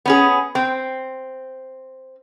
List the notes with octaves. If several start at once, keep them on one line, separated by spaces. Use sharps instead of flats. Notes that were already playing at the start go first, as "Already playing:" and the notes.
B3 C#4 G#4
C4